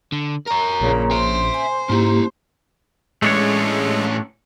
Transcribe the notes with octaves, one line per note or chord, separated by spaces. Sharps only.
D3
A#4 C#5 A#5
A#1 A#2 C#3 A#3
C5 E5 C6
G#5
G#2 A#3 C#4 E4 G4
A2 G#3 A3 C#4 D4 C#5